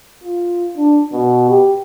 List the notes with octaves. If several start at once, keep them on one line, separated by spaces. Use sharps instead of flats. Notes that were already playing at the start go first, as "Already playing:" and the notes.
F4
D4
B2
G4